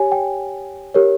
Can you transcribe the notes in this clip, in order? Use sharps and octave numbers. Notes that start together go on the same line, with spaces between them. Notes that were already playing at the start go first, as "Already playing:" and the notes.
Already playing: G4 C#5 G#5
G5
G4 A#4 C#5